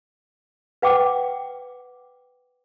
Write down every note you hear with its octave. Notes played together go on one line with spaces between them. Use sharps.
B4 F#5 G5 D6